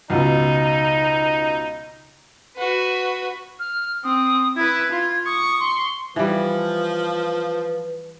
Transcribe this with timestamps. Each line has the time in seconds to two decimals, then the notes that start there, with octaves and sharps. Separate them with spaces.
0.10 C#2 B2 D#4
2.57 F#4 B4
3.60 F6
4.04 C4 D#6
4.57 E4 B4 G#6
4.91 F4
5.26 C#6 D#6
5.60 C6
6.16 E3 F3 G3 B4